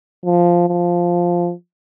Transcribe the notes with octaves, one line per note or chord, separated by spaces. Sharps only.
F3
F3